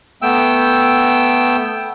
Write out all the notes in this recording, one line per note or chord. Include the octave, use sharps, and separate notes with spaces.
A3 B3 G5 E6